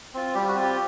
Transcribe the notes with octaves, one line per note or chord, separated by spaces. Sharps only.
C4 F4
G3 G4
F#4
C4 F4
G4